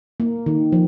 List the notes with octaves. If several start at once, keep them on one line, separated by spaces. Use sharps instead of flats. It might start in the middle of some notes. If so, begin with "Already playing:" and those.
A#3
D#3
F3